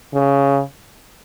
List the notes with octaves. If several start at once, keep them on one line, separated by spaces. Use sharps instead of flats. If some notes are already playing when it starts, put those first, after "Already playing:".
C#3